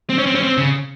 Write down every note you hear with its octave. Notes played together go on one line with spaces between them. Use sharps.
C4
C#4
C4
C#4
C4
C#3